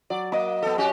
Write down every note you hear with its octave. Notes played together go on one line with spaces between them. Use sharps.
F#3 D5
A#3 D#5 D6
B3 A4
C#4 F#4 G4